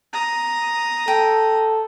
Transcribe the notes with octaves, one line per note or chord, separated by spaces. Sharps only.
A#5 D#6
A4 G5